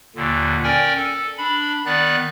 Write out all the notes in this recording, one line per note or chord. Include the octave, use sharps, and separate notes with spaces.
D#2 A#2 D3
C#4 A#4 D5 G5 G#5
A4
D4 B5
D#3 B3 D5 F#6